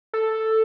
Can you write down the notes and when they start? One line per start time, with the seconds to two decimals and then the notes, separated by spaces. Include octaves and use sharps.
0.14 A4